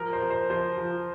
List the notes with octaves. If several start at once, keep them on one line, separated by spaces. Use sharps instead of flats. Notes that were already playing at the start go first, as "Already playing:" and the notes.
Already playing: F3 A#4
C5
F3
C5
F3 C5
F3